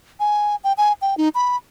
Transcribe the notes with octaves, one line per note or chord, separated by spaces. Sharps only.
G#5
G5
G#5
G5
D#4
B5